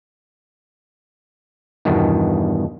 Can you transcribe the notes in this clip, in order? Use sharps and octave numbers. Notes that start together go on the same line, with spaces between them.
E2 G2 B2 D#3